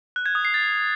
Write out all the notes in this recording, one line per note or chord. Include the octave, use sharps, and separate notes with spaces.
F#6
G#6
D#6
C7
A6